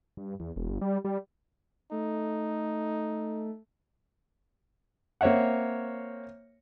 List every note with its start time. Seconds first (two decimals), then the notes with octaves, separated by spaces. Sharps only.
0.17 G2
0.40 E2
0.56 E1
0.70 G1
0.81 G3
1.05 G3
1.91 A3 D#4
5.21 A#3 C4 C#5 E5 F#5